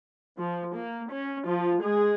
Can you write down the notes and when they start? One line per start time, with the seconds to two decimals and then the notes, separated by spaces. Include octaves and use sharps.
0.40 F3
0.76 A#3
1.11 C#4
1.47 F3 F4
1.83 G#3 G#4